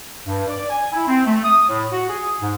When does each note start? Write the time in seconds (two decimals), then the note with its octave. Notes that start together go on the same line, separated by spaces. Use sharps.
0.26 G2
0.47 D5
0.70 G#5
0.92 E4
1.07 C4
1.26 A3
1.44 D#6
1.69 A2
1.92 F#4
2.09 G#4
2.41 G#2